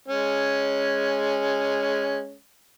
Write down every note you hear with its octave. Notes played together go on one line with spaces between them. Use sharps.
G#3 C#4